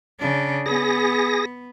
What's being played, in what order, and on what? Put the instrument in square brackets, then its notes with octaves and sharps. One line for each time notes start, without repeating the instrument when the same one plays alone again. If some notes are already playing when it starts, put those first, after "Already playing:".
[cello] C#3 D4
[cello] B3 [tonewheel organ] G#4 A#6